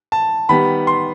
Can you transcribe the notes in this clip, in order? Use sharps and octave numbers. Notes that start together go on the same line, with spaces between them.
A5
D#3 G3 B3 B5
C6